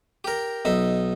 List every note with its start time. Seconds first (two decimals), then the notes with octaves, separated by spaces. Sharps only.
0.24 G4 A#4
0.65 B1 D#4 E5